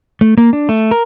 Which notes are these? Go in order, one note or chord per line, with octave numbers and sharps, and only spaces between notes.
A3
A#3
D4
A3
A#4